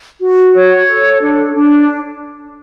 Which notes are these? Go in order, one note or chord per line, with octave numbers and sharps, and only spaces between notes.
F#4
C#5
A4
D4
D4